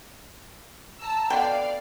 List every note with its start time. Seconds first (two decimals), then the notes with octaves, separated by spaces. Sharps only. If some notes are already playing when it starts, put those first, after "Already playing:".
1.00 A5 A#5 E6
1.30 B2 D3 D5 F5 G5